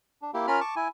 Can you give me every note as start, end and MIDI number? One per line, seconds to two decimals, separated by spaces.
0.22 0.31 62
0.34 0.46 58
0.34 0.46 64
0.34 0.46 67
0.47 0.60 61
0.47 0.60 65
0.47 0.60 70
0.47 0.60 83
0.47 0.60 89
0.61 0.75 81
0.61 0.75 85
0.61 0.75 86
0.76 0.88 64
0.76 0.88 80